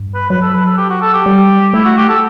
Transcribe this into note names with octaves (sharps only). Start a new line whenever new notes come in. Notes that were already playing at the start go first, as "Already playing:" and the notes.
Already playing: G2
B4
F#3 B4
A4
B4
A4
G4
F#4
A4
G4
G3
A3 E4
F#4
G4
A4